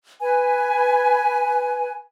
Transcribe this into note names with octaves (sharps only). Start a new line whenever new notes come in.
B4 G#5